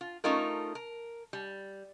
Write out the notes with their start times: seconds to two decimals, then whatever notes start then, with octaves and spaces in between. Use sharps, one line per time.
0.01 F4
0.24 A3 C#4 D#4 F4 A#4
0.75 A#4
1.33 G3